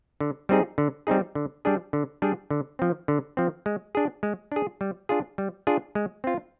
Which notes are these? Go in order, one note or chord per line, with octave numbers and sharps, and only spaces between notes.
D3
G3 C4 D#4 G#4
D3
G3 C4 D#4 G#4
D3
G3 D4 G#4
D3
G3 D4 G#4
D3
F3 C4
D3
F3 C4
G#3
D4 G#4
G#3
D4 G#4
G3
D4 F4 G#4
G3
D4 F4 G#4
G#3
C4 F4